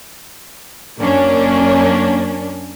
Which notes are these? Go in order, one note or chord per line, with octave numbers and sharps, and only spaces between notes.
F#2 A#3 C#4 D4